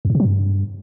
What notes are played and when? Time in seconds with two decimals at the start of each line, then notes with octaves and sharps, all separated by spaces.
0.05 F2
0.10 G#2
0.15 C3
0.20 F#3
0.25 G2